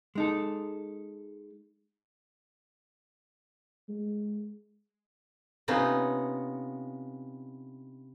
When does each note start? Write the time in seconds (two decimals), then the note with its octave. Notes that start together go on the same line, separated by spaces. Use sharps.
0.15 G#3 D#4 A4
3.89 G#3
5.68 C3 B3 C#4 D#4 F4